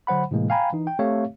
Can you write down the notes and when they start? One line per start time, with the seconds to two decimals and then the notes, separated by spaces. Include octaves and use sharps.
0.07 D3 F#3 C5 F#5 B5
0.31 A2 C3 E3 G#3 A#3
0.50 F5 G5 G#5 A#5 B5
0.73 E3 D#4
0.87 G5
0.99 A3 C4 G4 C#5 E5 F5